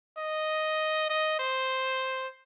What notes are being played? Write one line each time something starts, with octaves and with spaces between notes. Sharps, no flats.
D#5
D#5
C5